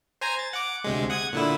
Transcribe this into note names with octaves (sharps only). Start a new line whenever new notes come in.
C5 G#5 A#5
A6
F#5 D6
D2 C3 G#3
F#5 D#6 G#6
A#2 D3 E4